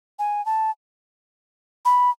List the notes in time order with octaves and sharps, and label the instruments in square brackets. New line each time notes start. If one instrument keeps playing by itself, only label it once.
[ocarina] G#5
A5
B5